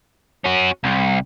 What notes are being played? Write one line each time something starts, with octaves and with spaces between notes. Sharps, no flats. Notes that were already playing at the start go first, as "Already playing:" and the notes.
C#4 F#4
C2